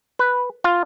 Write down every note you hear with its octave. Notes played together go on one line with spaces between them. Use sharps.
B4
F4